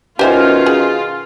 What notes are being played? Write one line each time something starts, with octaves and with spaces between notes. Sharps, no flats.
B2 D#3 C#4 F4 G4 C5 E5
G#4